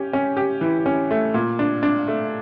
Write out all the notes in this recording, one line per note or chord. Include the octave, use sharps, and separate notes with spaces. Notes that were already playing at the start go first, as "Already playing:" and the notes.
Already playing: C#4 G4
C#4
G4
E3
C#4
A3
A#2
D4
D4
A3